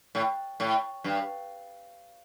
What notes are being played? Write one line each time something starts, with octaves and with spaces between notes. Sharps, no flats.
A2
A2
G2